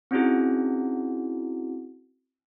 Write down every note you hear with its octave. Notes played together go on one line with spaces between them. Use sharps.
C4 C#4 D#4 E4 F#4 G#4